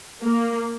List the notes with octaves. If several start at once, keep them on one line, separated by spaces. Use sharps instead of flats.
A#3